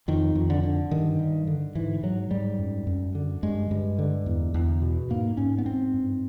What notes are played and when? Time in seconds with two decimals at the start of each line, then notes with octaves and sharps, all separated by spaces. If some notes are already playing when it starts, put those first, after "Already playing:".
0.08 F2 D#3
0.35 F2
0.50 D3
0.63 D3
0.91 G2 D#3
1.19 G2
1.47 D3
1.75 G#2 E3
2.03 G#2 F#3
2.31 G#2 G3
2.59 F#2
2.87 F#2
3.15 D3
3.43 G2 G#3
3.71 G2
3.99 D3
4.26 E2
4.54 E2
4.82 B2
5.10 G#2 A#3
5.37 G#2 C#4
5.58 B3
5.66 G#2 C4
5.94 G2